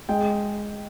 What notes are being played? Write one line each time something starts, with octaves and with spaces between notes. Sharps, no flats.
G#3 G5